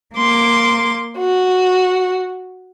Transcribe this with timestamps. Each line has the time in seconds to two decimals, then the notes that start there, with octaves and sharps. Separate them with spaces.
0.16 A#3 C6 D6
1.16 F#4